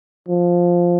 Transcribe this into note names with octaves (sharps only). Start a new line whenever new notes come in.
F3